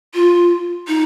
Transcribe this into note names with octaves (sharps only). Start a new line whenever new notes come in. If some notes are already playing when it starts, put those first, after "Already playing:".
F4
D#4